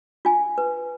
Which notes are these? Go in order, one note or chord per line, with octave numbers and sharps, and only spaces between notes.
F4 G#5
B4